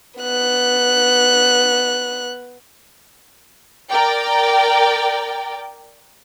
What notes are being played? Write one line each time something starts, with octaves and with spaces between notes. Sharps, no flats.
B3 F#6
A#4 D5 G5